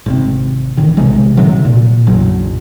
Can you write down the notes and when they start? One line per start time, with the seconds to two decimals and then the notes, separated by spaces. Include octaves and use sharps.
0.06 G#1 C3
0.77 A1 D#3
0.97 B1 C3 G#3
1.37 A2 C3 D#3 F#3
1.65 A#2
2.07 F#1 B1 F#3